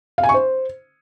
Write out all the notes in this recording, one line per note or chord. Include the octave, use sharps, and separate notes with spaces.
F5
G#5
C#6
C5